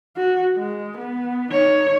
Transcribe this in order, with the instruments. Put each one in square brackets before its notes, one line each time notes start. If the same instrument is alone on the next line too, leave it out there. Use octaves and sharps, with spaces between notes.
[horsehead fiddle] F#4
G#3
B3
D#4 C#5